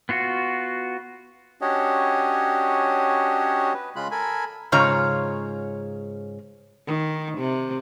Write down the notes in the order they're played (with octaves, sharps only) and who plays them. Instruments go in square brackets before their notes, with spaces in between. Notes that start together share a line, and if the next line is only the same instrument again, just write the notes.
[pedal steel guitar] B3 F4 F#4
[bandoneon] C#4 D4 F#4 G4 C#5 D#5
B4
C#3 G#3 F4 B5 F#6
A4 A#4 G#5 B5
[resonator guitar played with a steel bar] G#2 C#3 F4 C#5 A#5
[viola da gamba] D#3
C3